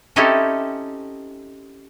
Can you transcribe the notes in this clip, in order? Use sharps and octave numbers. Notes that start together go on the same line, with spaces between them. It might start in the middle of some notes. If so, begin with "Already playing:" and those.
C4 C#4 D#4 E4 G4 A4